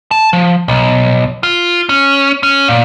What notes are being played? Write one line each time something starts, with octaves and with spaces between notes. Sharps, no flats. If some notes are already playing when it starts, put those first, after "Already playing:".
A5
F3
B1
F4
C#4
C#4
A#2